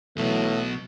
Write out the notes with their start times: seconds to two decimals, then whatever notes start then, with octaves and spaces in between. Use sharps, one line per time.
0.17 B1 B2 E3 F#3 A3